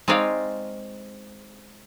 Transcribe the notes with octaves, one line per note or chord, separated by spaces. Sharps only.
G#3 C4 D#4 C#5 D5 F5